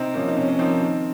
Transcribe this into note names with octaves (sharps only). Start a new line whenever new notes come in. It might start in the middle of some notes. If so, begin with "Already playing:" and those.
Already playing: C3 C4 D#4
F3 A#3 C#4
D#4
C3 C#4
C#4
F3 A#3 C4 D#4
D#3